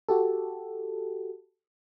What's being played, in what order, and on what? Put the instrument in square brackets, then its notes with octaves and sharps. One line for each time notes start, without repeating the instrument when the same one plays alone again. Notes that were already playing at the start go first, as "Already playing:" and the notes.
[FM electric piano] F#4 G4 A4